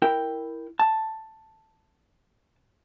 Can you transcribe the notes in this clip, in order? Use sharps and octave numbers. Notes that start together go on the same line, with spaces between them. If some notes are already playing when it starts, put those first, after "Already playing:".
E4 A#4 G5
A5